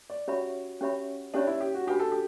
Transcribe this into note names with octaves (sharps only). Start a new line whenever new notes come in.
D5
C#4 F#4 G4 C#5 E5 B5
C#4 G4 C#5 E5 B5
C#4 D4 G4 C#5 E5 B5
E4
G4
F#4
D4 F#4 G4 B4 F#5 B5
A4
G4